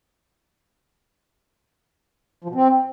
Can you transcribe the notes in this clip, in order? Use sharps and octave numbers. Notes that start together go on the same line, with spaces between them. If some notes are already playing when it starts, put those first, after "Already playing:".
F3
B2
C4